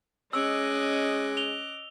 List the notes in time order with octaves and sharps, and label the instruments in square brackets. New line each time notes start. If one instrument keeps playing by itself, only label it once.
[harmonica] G#3 [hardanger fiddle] C#4 [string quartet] D#5 D6 F#6 [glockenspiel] E6
[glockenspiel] F7 G7